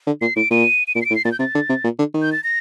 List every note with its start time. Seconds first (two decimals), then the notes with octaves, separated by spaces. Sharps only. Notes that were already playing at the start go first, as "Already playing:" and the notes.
0.07 D3
0.21 A#2 C7
0.36 A2 D7
0.51 A#2 D#7
0.88 D#7
0.95 A#2 D7
1.02 C7
1.05 A2 D7
1.15 C7
1.25 A#2 A6
1.32 G6
1.39 C3 A6
1.55 D3
1.69 C3
1.84 A#2
1.99 D3
2.14 D#3
2.22 G6
2.32 A6
2.44 A#6